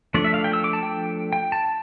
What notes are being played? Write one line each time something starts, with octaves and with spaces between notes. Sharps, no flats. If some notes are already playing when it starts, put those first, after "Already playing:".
F3 A3 D4 D5
E5
F5
G5
E6
D6
A5
G5
G5
A5